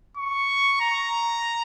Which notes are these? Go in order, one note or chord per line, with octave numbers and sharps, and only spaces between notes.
C#6
A#5